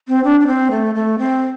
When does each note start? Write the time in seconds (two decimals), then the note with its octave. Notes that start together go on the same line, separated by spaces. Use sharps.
0.08 C4
0.24 D4
0.40 D4
0.47 C4
0.71 A3
0.95 A3
1.19 C4